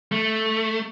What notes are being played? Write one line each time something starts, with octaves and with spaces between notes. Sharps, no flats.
A3